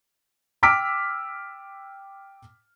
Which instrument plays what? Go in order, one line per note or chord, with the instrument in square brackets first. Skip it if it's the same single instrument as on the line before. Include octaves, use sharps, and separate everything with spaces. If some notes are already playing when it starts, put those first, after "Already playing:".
[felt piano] G5 D6 E6 F6 B6 D7